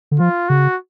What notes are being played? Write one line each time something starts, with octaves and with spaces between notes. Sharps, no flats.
D3
F3 F4
C#3 F#4